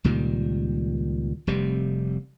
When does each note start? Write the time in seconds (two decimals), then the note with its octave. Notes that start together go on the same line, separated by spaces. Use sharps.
0.04 C#2 A#2 D#3 G3
1.47 F1 C3 G3